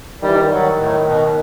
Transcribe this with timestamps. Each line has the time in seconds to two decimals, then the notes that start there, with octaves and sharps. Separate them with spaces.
0.21 D#3 G3
0.29 E3
0.36 D#3
0.49 F#3
0.77 A2
1.05 B2